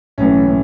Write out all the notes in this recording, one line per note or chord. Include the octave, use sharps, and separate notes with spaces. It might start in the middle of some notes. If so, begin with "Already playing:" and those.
B1 A2 E3 C#4
A2